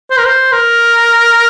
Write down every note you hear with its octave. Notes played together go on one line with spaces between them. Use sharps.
C5
A#4
C5
A#4